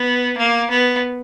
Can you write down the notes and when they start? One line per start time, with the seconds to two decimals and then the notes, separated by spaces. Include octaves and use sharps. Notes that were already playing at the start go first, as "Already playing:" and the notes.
Already playing: B3
0.38 A#3
0.70 B3